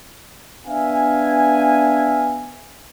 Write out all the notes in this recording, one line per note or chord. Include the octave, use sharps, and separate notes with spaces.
B3 D4 E5 F5 G#5